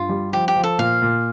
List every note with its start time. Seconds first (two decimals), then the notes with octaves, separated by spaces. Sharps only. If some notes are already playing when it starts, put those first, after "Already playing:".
Already playing: G2 F4
0.09 G3
0.33 F3 G4
0.48 G4
0.56 F3
0.64 A4
0.78 A#2 F5
1.02 A#2